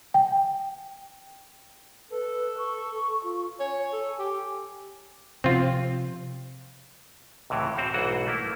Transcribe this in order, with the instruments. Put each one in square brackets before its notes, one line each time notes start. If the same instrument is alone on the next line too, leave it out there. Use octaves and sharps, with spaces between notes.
[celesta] G5
[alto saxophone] A4 [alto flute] B4
[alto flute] C#6
F4
[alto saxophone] C#5 [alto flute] G#5
[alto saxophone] A4
G4
[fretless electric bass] C3 F3 [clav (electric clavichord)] C4 F4
[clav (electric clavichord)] C#2 A2 C3 E3
C4 F#4 C5 F5 F#5
B1 G#2 E3 F#4 C5 F#5
A3 A#3 E4